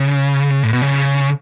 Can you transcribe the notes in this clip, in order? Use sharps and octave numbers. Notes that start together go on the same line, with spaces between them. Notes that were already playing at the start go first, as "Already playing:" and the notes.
Already playing: C#3
A2
B2
C#3